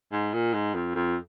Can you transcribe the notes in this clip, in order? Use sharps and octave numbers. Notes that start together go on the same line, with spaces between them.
G#2
A#2
G#2
F2
F2